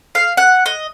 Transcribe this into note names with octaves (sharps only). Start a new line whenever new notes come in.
F5
F#5
D#5